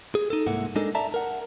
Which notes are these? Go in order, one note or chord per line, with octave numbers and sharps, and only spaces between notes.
G#4
D#4 A4
C2 G#2 A#3 E4 F#5
G#3 D4 D#4 A4 A#4
D5 E5 A5 A#5
A#4 F#5